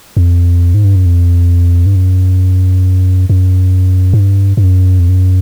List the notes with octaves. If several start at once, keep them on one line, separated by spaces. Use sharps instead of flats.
F2
G#2
G2
F#2
F2
G2
F#2
F#2
G#2
G2
G2
F#2
F2
F#2